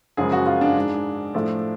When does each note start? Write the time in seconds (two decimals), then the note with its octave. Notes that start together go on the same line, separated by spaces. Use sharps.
0.17 F#2 C#3 F3 G#3 G#4
0.32 F#4
0.46 F4
0.61 D4
0.76 G#2 G#3
1.35 A2 F3 A3